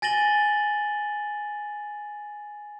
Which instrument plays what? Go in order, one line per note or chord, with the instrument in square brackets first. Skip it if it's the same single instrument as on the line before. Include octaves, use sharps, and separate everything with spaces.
[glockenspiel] G#5 A6 A#6 D#7 F#7 G7